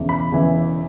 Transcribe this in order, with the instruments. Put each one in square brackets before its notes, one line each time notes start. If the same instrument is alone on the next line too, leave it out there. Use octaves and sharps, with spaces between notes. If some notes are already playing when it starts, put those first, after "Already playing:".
Already playing: [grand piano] E1 E2 C#3 E3
B5
E1 E2 C#3 E3